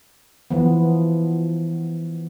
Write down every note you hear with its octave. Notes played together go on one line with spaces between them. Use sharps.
E3 F3 B3